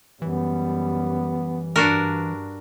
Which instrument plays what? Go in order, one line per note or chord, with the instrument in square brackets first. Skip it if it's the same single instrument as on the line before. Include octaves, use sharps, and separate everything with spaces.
[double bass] F#2 G3 [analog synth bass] E3 [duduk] B3
[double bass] G2 [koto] D4 F#4 A#4